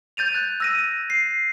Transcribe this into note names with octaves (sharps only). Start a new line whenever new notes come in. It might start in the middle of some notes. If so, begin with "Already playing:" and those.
G6 A6 D#7 F7
F#6 G6 A6
E6 A#6 D#7
C7